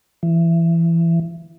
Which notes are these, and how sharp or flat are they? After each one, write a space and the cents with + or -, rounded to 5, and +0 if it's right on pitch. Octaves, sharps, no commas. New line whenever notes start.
E3 +20